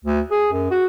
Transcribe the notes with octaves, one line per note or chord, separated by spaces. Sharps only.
D2
G#4
F#2
F#4